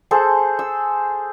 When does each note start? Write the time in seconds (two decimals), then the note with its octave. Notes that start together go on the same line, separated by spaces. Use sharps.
0.11 G#4 A4 C5
0.59 E6